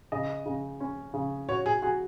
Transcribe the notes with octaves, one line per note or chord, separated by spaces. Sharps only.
C#3 D#5
C#3
C#4
C#3
F#4 C#5
G#4
F#4 G#4